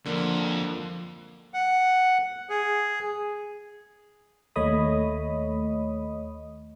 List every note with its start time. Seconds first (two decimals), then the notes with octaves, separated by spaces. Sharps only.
0.05 F2 D3 A#3
1.54 F#5
2.50 G#4
4.56 D#2 A3 C#5 D#5 B5 D#6